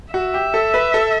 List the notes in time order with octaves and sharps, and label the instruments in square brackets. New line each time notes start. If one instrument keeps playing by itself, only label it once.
[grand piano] F#4 [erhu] E5
[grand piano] G4
A4
B4
A4